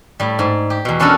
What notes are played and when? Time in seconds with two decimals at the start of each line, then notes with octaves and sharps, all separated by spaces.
0.20 A2 G3
0.39 G#2
0.70 G4
0.85 E2 B2
1.00 B3 C#4 D4 F#4 A4 A#4